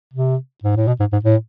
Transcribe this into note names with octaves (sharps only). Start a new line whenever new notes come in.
C3
G#2
A2
B2
G#2
G#2
A2